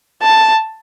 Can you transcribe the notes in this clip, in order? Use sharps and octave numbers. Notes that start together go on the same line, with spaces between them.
A5